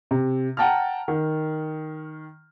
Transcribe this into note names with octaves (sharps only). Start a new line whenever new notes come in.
C3
F#5 G5 A5 A#5 F6
D#3